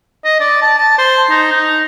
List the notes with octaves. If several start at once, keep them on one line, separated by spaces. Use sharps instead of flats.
D#5
D5
A5
A5
C5
D#4
D#4